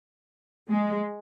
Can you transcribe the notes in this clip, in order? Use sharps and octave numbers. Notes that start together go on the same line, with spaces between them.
G#3